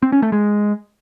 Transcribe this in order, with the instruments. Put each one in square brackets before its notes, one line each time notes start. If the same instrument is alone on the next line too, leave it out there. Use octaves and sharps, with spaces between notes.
[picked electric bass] C4
C#4
A3
G#3